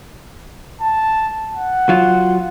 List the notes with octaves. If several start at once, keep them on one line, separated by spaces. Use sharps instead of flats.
A5
F#5
F#3 F4